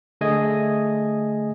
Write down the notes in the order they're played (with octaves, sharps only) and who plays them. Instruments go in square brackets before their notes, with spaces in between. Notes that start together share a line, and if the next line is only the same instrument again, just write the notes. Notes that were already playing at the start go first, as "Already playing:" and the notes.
[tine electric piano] D3 A3 G#4 D#5 G#5